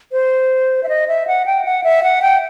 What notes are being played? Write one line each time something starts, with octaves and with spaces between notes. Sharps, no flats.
C5
E5
D#5
E5
F#5
G5
F#5
E5
F#5
G5